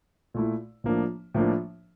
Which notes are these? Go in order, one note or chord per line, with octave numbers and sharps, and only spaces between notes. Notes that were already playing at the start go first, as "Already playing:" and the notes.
A#2 A3 E4
A2 F3 A#3 D4
A2 F3 A#3 D4